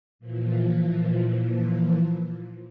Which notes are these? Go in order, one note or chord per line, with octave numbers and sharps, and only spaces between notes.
A#2 E3 F3